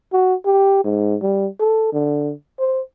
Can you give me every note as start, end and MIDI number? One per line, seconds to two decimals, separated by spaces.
0.13 0.34 66
0.45 0.82 67
0.84 1.16 44
1.22 1.47 55
1.60 1.88 69
1.92 2.33 50
2.59 2.81 72